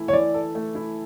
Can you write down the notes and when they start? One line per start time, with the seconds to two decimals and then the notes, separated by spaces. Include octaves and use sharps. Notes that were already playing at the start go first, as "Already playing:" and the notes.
Already playing: E3 A3 E4 A4
0.08 C#5
0.13 E3 D5
0.34 A4
0.55 A3
0.75 E4